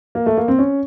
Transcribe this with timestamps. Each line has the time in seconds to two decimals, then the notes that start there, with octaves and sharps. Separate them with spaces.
0.15 A#3
0.26 A3
0.37 A#3
0.48 C4
0.59 C#4